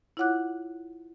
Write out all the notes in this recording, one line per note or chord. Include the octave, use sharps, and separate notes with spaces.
E4 F4 C#5 F#5 D6 F#6